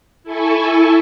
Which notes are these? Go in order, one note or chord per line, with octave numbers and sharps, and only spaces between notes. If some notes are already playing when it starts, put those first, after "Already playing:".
E4 A4 G#5 C#6